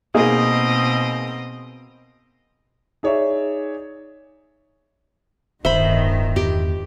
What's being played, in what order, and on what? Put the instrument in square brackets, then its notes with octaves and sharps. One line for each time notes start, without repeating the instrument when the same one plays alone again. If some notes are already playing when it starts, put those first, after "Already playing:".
[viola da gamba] B2 C4 D#5 [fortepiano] A#3 D#4 G#4
[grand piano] D#4 G#4 C#5 D5 E5
[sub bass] D1 [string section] G1 D#3 [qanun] C5 B5 [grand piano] E5
[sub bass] E2 [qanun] G4